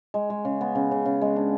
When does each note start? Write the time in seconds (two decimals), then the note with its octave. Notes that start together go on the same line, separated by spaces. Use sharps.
0.14 G#3
0.30 G#3
0.45 C#3
0.61 B3
0.75 C#3
0.91 C#3
1.05 C#3
1.21 G#3
1.36 D4